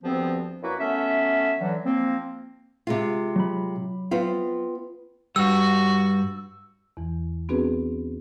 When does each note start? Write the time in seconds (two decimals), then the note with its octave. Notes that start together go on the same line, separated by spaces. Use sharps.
0.03 D2 G2 F3 B3 C4
0.62 F#2 A#3 E4 F#4 B4
0.79 F#3 A3 B3 C#4 E5
1.59 D3 E3 F#3
1.84 F3 A#3 C4
2.87 C3 G#3 F4
3.36 F#3 B5
4.11 B3 C4 F4
5.36 G2 G3 F#4 E6
6.97 E2 E3
7.49 B3 C4 D4 F#4 G#4 B4